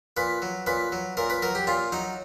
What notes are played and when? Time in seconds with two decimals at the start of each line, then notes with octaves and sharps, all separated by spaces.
0.17 A#2 B4
0.42 F#3
0.67 A#2 B4
0.92 F#3
1.17 A#2 A#4
1.30 B4
1.42 F#3 A#4
1.55 G4
1.67 A#2 F4
1.92 F#3 D#4